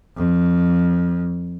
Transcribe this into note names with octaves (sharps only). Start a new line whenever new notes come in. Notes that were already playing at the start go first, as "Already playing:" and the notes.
F2